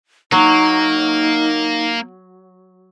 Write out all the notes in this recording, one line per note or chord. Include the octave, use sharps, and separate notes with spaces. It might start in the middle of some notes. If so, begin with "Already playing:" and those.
F#3 A#3 D#4